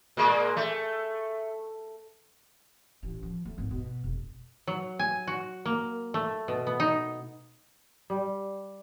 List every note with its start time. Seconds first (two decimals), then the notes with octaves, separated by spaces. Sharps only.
0.17 A#2 G#3 A#3
0.57 A3
3.03 A1
3.23 F3
3.45 A3
3.58 G#1
3.71 B2
4.04 F1
4.67 F#3
4.99 G#5
5.27 F#4
5.65 A#3
6.14 A3
6.48 B2
6.67 B3
6.80 D#4
8.10 G3